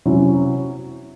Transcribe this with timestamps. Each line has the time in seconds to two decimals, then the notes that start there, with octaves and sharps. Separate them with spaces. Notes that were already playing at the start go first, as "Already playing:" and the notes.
0.05 C3 F#3 C#4 E4